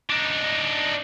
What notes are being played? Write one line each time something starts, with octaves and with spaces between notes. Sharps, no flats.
D4 D#4